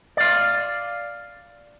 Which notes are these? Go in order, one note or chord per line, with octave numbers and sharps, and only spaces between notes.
D5 F5